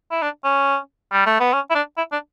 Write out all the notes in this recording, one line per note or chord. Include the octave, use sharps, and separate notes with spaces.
E4
D4
C#4
G3
A3
B3
C#4
E4
D4
E4
D4